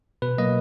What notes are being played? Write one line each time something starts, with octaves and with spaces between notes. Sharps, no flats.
B2 B4
F#3 A#3 D#5